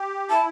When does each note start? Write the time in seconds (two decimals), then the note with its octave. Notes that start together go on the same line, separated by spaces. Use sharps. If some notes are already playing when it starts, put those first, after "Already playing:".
Already playing: G4
0.30 E4 A5